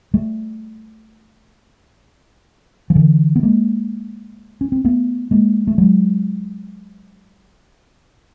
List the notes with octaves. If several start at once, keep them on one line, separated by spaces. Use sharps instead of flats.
G3 A3
F3
D3 E3
B3
G#3 A#3
C#4
C4
A3 B3
G#3 A#3
A3
F#3 G#3